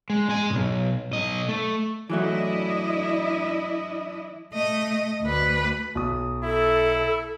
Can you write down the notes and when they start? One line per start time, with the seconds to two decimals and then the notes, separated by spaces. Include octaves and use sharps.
0.10 G#3
0.29 G#3 G#5
0.50 B1 B2
1.11 B1 D#5
1.49 A3
2.10 E3 F#3 A3 D4 E4 D#5
4.53 A3 D#5
5.22 D2 B4
5.95 B1 D#6
6.44 E4 A4